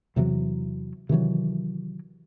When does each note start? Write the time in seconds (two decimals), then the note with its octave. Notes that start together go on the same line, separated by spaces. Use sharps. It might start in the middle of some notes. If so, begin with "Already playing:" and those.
0.16 E2 C3 E3 F#3
1.09 C3 D#3 E3 F#3